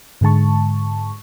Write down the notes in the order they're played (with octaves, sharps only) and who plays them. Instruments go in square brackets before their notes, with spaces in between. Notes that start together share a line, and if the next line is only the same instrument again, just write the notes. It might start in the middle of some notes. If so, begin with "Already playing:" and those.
[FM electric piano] G#2 D3 G#3 A5 C#6